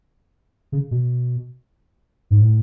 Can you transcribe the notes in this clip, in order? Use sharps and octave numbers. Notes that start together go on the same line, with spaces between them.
C#3
B2
G#2
A2